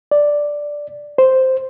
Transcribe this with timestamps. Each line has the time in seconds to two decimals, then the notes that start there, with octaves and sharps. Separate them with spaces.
0.11 D5
1.18 C5